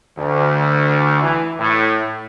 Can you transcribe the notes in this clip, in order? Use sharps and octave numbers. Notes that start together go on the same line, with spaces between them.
D2
E3
A2